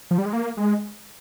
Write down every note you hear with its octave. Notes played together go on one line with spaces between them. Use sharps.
F3
G3
G#3
A#3
G#3